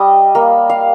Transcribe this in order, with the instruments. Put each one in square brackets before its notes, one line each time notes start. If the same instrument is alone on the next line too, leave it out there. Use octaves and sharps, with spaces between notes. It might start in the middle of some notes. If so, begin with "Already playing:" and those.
Already playing: [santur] G3 D#5
A#3
F5